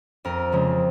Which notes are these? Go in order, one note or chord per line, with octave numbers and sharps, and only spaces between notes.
F2 A#4
C#3 F3 G#3